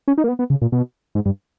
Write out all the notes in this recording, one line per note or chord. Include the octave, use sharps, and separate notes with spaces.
C#4
D#4
A#3
B3
B3
C#3
A#2
B2
G#2
G2